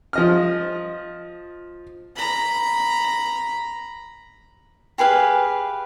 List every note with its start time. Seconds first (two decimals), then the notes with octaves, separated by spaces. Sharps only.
0.13 F3 D#5 F6
2.16 A#5 B5
4.98 G4 G#4 B4 F5